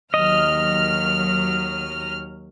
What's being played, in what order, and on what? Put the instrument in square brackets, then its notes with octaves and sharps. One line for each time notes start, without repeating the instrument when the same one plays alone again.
[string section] D#2 F#3 F6 [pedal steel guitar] D#5